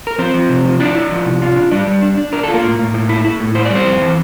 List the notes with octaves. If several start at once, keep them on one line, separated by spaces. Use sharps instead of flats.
A#4
F3 C4 C5
F3
C3
F3
D4 E4 D5
E4
F3
C3
F4
D4
G3 D4 D5
G3
D4
D4
D4 A#4
F4 A4
A#3 A#4
A2
A2
A2
E4
E4
A2
E4 C5
D5
G3 C4 C5
F2
E3